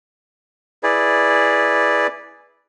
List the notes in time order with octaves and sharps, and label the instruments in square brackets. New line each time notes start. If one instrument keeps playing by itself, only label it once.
[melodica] E4 G#4 B4 D5